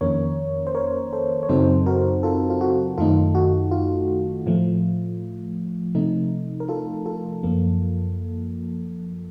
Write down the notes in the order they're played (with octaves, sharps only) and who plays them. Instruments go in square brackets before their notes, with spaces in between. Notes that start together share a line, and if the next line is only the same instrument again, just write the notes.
[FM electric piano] F2 D#3 A#3 C#4 A#4 C#5
C5
A#4 C#5
A4 C5
C#5
F#2 C#3 F#3 C4 D#4 A4 C5
F#4 A#4
F4 A4
F4
F#4
F#2 D#3 A3 D#4 F4 A4
F#4
F4
A2 F3 A3
C3 F3 A3 D#4
A#4
F4 A4
F4 A4
F#2 F3 A#3